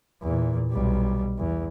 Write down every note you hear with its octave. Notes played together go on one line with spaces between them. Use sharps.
E2 A#2
B1 G3
E2